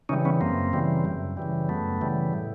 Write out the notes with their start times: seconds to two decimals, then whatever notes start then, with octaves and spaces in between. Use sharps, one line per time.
0.09 C#3 E3 G3 C#4 D#4
0.25 B3 C#4
0.41 F#2 A#3 C4
0.73 C#3 E3 G3
1.05 F#2
1.37 C#3 E3 G3
1.69 F#2 A3 B3
2.01 C#3 E3 G3
2.33 A2